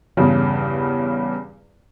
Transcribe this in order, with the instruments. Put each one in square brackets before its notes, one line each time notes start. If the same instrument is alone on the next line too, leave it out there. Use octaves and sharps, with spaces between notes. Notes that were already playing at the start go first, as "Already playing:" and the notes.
[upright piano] E2 G2 C#3